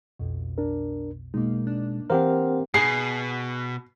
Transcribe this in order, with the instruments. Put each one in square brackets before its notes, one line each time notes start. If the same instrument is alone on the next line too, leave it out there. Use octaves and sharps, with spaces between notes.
[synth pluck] B1 F2 B2
[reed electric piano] D4 A#4
[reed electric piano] B2 G#3 [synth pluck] A#3 D#4
[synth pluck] D4
[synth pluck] E3 F5 [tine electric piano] C4 G4 A#4 [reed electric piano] C5 F#5
[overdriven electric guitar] B2 [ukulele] G#4 [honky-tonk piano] C7